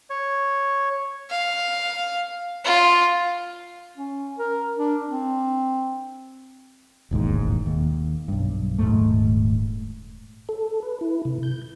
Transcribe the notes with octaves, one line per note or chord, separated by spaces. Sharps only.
C#5
F5
F4
C#4
A#4
D4
C4
E1 A1 D#2 G#2
D#2
B1 G2
D#1 G#2 A3
A4
B4
E4
C3
G6